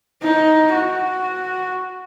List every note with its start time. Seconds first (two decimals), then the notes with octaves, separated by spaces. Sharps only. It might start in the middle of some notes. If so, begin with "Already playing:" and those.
0.22 D#4
0.74 F#4